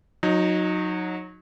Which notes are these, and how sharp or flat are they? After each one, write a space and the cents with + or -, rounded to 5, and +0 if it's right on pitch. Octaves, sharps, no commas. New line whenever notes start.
F#3 -25 D#4 +0